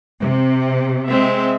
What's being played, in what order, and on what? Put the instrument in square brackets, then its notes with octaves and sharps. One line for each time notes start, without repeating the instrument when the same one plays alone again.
[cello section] C3
[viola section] G#3 C4 E5